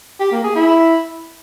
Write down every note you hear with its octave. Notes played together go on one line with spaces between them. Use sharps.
G4
A#3
G#4
E4